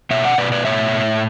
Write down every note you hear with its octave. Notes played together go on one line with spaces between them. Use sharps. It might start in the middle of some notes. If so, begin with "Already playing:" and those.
B2 C#5 E5
D5 F#5
B2 B4 D5
B4 D5
A2 C#5 E5
A2